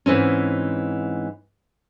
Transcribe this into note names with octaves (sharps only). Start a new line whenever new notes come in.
G#2 E3 C4 C#4